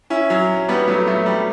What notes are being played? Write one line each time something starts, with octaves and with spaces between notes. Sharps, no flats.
C#4 E4
F#3
G3 B3
F#3 A3
F#3 A3
G3